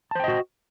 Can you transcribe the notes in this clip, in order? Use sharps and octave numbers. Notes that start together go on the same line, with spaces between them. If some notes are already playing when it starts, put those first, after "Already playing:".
F#4 C5 D#5 G5 A5